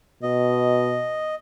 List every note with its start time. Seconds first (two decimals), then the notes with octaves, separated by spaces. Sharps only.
0.23 B2 D#5